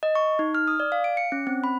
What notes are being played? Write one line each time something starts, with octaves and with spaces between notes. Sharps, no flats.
D#5
C#6
D#4
F6
D#6
D5
F5
D7
C#7
C#4
C4
B5